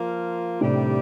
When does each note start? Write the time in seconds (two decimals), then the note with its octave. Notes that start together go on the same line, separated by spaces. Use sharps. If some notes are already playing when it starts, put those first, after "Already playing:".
Already playing: F3 A#3 F4
0.61 A2 C3 D#3 G3 D4 G4